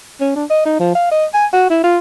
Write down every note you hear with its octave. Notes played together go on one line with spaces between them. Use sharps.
C#4
D4
D#5
D#4
F3
F5
D#5
G#5
F#4
E4
F4